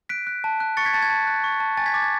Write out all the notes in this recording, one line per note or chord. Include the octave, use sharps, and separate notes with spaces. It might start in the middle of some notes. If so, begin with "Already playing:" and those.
F#6 B6 D7
F#6
A5
F#6
C#6 A6 C#7
G#6 B6
A5 A6
G#6
A5
F#6
C#6
A5
G#5 A6
G#6 B6
D6 A6
G#6